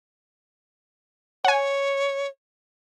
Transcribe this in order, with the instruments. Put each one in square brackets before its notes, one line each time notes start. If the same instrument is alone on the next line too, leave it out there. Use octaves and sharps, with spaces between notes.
[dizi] C#5 [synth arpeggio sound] F#5 G#5